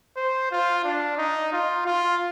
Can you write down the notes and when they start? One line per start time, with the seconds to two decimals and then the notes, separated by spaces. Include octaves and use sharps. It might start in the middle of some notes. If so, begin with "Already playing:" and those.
0.16 C5
0.51 F4
0.84 D4
1.18 D#4
1.53 F4
1.86 F4